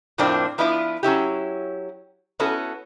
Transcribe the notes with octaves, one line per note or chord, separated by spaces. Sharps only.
F2 A2 F3 A#3 C4 D4
F3 B3 D4 E4 F4 B4
F#3 C#4 E4 G4
B3 C#4 E4 F#4 A4